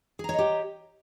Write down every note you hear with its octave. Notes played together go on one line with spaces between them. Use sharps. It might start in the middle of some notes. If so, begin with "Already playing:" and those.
G4 G#4 C#5 D#5 A#5